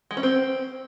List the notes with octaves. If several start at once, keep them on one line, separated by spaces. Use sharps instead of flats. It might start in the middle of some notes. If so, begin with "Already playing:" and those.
G#3
C#4
C4